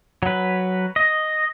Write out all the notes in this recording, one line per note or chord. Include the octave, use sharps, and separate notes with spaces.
F#3 B4
D#5